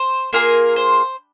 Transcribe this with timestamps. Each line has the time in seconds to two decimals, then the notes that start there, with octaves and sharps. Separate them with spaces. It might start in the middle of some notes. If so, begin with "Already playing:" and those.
Already playing: C5
0.33 A#3 F4 G#4 A#4
0.76 C5